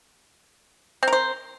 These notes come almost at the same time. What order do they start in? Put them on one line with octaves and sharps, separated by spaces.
C4 A#4 C5